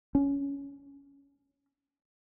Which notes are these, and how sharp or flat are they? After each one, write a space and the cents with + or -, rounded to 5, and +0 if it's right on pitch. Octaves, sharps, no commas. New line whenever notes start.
C#4 +15